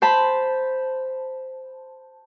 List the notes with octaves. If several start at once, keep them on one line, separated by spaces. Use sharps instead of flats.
C5 A5 B5